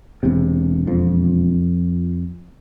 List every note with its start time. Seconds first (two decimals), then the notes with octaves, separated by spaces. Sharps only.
0.23 E1 E2 C3
0.87 F2 F3